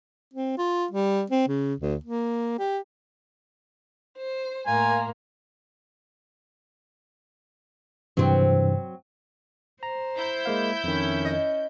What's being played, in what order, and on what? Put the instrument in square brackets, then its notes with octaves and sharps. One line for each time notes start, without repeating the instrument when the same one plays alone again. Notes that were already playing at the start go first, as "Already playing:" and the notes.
[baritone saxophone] C4
F4
G3
C4
C#3
D2
A#3
G4
[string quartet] C5
[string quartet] A2 A#3 [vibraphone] F5 A#5 C6 [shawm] G#5
[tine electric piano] G2 C3 E3 [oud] F#3 C4
[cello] C5 [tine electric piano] A#5
[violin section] E4 G6
[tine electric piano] G#3 A#3 F5
[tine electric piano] F2 D#3 [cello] C#4
[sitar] D#5